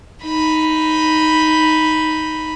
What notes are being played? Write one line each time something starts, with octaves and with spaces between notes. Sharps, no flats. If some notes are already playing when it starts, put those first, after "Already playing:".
D#4 B5